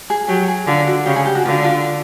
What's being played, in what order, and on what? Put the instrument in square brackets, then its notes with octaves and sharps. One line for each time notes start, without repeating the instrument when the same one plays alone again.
[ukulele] G#4
[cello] F#3 [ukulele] G4
[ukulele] G#4
[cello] D3 [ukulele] F4
[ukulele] F#4
[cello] C#3 [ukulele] G4
[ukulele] G#4
G4
F#4
[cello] D3 [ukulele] F4
[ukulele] F4